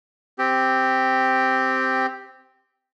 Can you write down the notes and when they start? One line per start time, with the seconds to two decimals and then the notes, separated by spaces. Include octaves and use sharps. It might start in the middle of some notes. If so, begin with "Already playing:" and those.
0.39 C4 G4